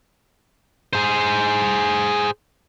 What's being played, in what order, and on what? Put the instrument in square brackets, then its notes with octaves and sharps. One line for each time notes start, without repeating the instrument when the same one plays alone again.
[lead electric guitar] G#4 C5